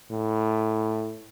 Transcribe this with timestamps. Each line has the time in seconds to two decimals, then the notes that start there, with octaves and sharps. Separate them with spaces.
0.10 A2